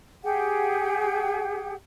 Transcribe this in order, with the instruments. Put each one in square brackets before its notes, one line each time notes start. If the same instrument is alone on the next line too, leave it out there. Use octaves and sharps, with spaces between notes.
[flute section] G4 G#4 F#5 G5